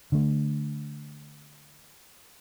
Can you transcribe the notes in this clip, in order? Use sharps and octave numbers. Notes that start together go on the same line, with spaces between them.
D3 A3